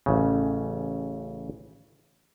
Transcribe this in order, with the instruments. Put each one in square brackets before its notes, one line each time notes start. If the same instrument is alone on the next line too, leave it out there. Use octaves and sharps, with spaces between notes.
[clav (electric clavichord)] A1 C#3